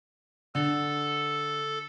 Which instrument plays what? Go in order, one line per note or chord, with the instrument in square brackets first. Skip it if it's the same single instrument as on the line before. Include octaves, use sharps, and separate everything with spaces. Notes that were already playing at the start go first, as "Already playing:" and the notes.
[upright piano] D3 [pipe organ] A4